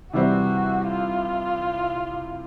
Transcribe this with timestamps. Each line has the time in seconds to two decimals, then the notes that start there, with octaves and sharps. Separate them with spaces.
0.13 C3 E3 G3 C4 E4 F#4
0.87 F4